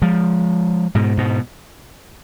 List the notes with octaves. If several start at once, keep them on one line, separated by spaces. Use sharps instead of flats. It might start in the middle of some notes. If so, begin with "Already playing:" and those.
F3 G#3
G#2 B2
G#2 B2